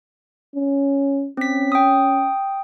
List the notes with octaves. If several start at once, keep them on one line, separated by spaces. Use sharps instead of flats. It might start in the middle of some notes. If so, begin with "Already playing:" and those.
C#4
C4 C#4 B6
G5 D#6